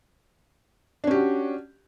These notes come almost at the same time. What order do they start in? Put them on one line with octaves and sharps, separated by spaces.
D4 C#4 G4 F#4